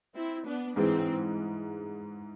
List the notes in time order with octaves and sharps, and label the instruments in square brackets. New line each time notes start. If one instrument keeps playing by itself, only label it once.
[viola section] C4 E4
B3 D4
[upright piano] G#2 E3 G#3 [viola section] C4